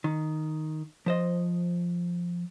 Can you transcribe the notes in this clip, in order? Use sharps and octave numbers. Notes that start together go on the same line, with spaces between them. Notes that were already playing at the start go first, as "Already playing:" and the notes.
D#3
F3 C5 D#5